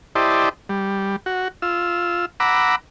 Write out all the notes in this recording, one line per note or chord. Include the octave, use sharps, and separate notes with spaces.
E4 G4 C5 D5 D#5 A5
G3
F#4
F4 E6
F#5 A#5 B5 D6 E6